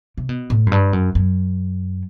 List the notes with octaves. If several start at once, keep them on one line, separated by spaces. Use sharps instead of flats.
C3
B2
A2
F#2
G2
F#2
F#2